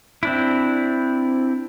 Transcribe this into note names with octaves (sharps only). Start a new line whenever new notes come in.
C4 D4 E4